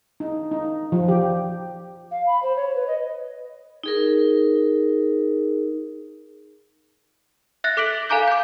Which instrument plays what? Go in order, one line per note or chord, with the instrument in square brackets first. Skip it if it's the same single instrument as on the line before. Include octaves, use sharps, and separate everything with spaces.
[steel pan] D#4
D#4
F3
G4
[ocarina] F5
B5
C5
C#5
B4
D#5
[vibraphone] D#4 G#4 A#4
[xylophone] E5 F#6 A6 A#6
A4 D6 F#6 B6 D7 F#7
A4 F5 G#5 A#5 D6 G6
D6 G6